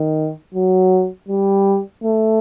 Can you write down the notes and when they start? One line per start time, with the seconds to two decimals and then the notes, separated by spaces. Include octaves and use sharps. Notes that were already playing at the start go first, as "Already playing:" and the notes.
Already playing: D#3
0.54 F#3
1.29 G3
2.03 A3